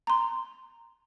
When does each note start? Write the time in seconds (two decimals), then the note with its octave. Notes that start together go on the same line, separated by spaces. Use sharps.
0.07 A#5 C6